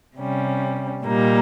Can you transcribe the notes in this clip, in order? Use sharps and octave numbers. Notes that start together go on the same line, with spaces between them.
C3 G3 C#4
A#2 G3 A#3 D#4